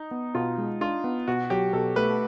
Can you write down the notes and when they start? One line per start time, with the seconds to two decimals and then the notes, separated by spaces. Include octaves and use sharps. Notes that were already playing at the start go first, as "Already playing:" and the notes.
Already playing: D#4
0.11 B3
0.35 B2 F4
0.58 G#3
0.81 D4 F4
1.04 B3
1.27 B2 F#4
1.50 F#3 G4
1.73 B2 A4
1.96 A3 B4